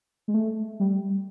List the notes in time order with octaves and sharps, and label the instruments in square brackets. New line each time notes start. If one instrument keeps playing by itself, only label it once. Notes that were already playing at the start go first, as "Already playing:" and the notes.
[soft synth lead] G#3
A3
G3